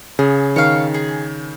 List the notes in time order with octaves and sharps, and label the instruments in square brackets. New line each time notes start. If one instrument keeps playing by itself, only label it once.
[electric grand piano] C#3 [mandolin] G#4
[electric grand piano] D#3 [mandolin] C#5 F5
[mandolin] G#4